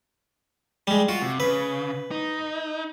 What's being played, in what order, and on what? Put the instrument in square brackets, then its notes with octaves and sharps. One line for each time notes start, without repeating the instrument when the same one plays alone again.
[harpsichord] G3 G#3
[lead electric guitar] F4 [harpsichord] F#4
[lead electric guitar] C3
[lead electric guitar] C#3 [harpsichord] B4
[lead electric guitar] D#4